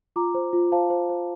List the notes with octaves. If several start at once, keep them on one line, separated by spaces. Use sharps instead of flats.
F4 A#5 D6
C5
F4
C5 F5 A5
C5
C5